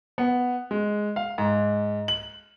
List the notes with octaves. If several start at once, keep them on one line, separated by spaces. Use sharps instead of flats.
B3
G#3
F5
G#2
F#7